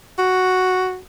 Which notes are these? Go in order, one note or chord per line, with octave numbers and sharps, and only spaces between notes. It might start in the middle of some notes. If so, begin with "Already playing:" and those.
F#4